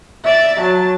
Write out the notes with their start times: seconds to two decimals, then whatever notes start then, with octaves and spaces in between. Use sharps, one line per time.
0.24 D5 E5
0.60 F#3 A5